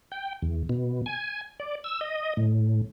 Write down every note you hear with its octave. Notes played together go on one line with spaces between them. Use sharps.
G5
E2
B2
G#5
D5
E6
D#5
A2